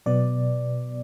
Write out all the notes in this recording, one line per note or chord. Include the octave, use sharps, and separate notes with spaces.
B2 F#3 B3 D5